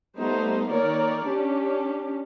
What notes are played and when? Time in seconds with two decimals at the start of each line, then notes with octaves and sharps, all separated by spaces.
0.17 G3 A3 B3 D#4 C5
0.70 D#3 A#3 A#4 C#5 D5
1.26 C#4 D4 G4